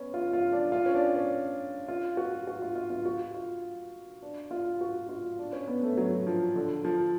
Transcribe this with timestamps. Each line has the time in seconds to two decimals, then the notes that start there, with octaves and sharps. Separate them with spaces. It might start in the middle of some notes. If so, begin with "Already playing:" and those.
Already playing: B3 C#4
0.14 F4
0.33 F4
0.52 D4
0.72 F4
0.86 C#4
0.95 D4
1.01 C#4
1.16 C#4
1.88 F4
2.17 F#4
2.47 F#4
2.62 F4
2.76 F4
2.90 F4
3.05 F#4
3.34 F4
4.23 D4
4.51 F4
4.81 F#4
5.09 F4
5.39 D4
5.53 C#4
5.68 B3
5.83 A3
5.97 F#3
6.27 F3
6.56 D3
6.85 F3